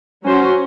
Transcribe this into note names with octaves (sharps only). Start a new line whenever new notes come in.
F#3 C#4 F#4 C5